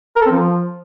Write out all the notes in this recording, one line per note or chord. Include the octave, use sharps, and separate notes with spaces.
A#4
A4
C4
F3